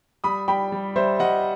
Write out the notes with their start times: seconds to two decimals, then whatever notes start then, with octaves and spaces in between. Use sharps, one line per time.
0.24 G3 B5 D#6
0.48 G3 G5 B5
0.72 G3
0.96 G3 C5 E5
1.19 G3 D#5 F#5